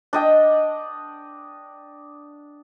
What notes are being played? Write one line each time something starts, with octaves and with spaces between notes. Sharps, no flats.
D4 D#5 G5